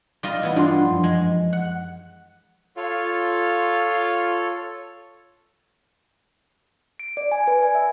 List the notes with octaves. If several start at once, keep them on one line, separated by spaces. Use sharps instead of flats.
G3 F4 D#5
E3 B3
G2 D4 F4 C6
F#2 F3
G#3
F#5
F4 A4 C#5
D7
D5
G#5
B4
G#5
E5